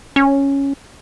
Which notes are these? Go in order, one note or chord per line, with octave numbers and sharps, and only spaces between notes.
C#4